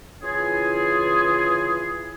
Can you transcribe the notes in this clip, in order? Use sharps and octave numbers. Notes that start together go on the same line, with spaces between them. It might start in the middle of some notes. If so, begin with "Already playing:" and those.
C#3 E3 E4 F4 G#4